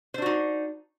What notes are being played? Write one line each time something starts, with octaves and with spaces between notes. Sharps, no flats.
D4 D#4 F#4 C5